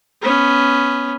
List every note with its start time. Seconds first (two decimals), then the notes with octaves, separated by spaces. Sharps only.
0.22 B3 C#4